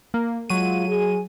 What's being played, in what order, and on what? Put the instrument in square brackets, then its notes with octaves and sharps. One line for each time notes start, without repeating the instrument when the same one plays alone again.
[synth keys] A#3
[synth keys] F#3 D#7 [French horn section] G#3 F4
[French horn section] G#4